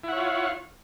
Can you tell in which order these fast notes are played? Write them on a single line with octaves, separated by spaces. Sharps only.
E4 F#5 C#5 F4